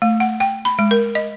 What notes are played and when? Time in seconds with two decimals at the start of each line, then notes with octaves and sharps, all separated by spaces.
0.02 A3
0.20 F#5
0.40 G5
0.65 B5
0.79 G#3
0.91 A#4
1.15 D#5